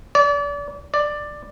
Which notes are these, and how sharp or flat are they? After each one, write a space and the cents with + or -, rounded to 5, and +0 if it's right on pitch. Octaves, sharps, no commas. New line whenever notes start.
D5 -35
D5 +10